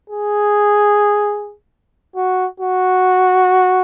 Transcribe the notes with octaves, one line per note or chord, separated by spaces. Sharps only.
G#4
F#4
F#4